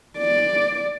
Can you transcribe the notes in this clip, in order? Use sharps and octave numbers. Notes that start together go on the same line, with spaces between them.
D5